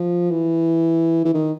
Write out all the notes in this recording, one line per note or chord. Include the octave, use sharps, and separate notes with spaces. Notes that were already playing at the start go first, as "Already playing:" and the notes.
Already playing: F3
E3
E3
D#3